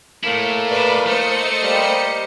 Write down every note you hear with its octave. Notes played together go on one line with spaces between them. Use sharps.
A2 A3 A#3 E4
B4 D5
A3 C5 D#5 C#7
G3 A#3